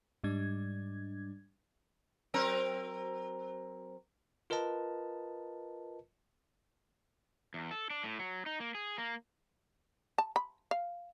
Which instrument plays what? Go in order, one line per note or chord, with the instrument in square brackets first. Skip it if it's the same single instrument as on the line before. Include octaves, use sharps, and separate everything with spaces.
[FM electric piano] G#2 G3 D4 G#6
[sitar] F#3 C4 A#4
[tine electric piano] F4 A#4 B4 D#5 A5
[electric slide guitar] E2
A4
D4
A2
F#3
D#4
A#3
G#4
A#3
[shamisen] A5
B5
F5